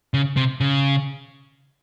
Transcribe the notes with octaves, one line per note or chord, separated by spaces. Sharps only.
C#3
C3
C#3